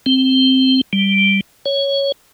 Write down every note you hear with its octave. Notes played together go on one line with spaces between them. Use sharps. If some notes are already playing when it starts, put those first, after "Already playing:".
C4
G3
C#5